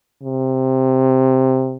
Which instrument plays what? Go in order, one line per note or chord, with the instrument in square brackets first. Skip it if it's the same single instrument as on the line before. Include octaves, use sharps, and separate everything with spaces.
[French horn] C3